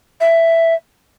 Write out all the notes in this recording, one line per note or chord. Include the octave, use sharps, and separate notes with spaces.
E5